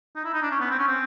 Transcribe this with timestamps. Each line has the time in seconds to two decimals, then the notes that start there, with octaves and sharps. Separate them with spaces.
0.16 D#4
0.25 E4
0.34 D#4
0.42 D4
0.51 C#4
0.60 B3
0.70 C4
0.79 C#4
0.88 C4